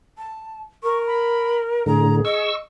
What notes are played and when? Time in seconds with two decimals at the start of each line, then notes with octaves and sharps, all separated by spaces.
0.18 A5
0.83 A#4 C#6
1.07 B5
1.86 A2 D3 G#4 A#5
2.25 D#5 C#6 E6